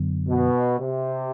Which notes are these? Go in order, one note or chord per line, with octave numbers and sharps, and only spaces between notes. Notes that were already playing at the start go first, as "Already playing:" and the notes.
Already playing: F#2 D3 F#3 B3
B2
C3